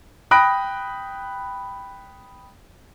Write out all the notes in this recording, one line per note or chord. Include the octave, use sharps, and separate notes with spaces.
G5 B5 D#6 F#6 A#6 D7